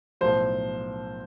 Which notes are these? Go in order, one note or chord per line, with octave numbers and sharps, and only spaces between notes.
B1 A2 F3 C5